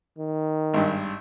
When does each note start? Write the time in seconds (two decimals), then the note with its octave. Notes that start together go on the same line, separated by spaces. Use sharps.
0.18 D#3
0.74 G#1 G2